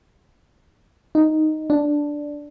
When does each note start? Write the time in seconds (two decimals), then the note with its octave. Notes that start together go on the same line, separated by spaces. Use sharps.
1.15 D#4
1.70 D4